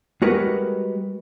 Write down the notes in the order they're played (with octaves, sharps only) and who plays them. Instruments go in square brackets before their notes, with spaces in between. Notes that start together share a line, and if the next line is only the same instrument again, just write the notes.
[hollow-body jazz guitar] G3 G#3 F#4 A#4 B4